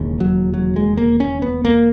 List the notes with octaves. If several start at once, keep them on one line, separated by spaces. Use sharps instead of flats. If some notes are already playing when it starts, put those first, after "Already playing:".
Already playing: E1 D#2 C#3
F#3
F#3
G#3
A#3
C#4
B3
A#3